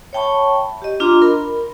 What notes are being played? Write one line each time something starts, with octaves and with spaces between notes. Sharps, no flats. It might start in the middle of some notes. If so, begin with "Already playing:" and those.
C#5 E5 G5 A5 B5 C#6
G4 D#5
D4 F4 D#5 A#5 C6 D6
A#4 B5